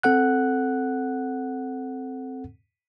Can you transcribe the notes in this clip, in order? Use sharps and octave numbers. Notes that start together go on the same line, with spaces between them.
C4 A4 F#5 F#6